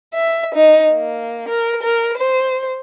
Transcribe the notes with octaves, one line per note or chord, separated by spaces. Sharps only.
E5
D#4
A#3
A#4
A#4
C5